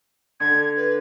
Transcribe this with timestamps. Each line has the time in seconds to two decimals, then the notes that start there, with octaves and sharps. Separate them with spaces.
0.40 D3 G#6
0.76 B4